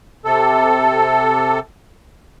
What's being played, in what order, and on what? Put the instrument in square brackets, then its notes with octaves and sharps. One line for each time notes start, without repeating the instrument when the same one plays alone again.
[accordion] C3 A4